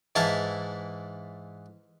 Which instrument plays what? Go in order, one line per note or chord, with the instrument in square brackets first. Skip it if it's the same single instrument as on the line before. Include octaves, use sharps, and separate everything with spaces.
[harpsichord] G#2 E3 E4 F5 A5